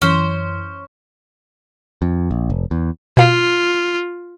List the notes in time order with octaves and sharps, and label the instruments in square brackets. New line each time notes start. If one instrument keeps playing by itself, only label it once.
[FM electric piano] F#2 E3 [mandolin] C#4 C5
[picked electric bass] F2
A#1
F1
E2
[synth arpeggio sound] B2 F5 [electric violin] F4